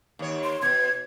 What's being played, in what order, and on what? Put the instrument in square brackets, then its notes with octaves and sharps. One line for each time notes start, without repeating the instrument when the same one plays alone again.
[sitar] D#2 C#5
[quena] C6
[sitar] B2 [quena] G#6